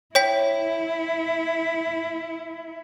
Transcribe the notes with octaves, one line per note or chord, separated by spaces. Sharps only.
E4 C#5 G5 B6